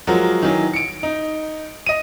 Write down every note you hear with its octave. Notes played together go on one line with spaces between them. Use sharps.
F3 F#3 G#3 F#4 A#4
D#3 E3 F#3
C#7 D7
D#4
D#5 D#7